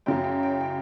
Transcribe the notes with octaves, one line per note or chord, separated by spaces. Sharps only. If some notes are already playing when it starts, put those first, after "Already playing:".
F#2 C#3 F#3 G5
G5
G5
G5